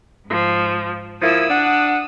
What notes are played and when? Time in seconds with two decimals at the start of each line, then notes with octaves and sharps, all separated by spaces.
0.25 G#2 F3
1.21 F3 A#3 E4 D#6 E6
1.50 D4 F#5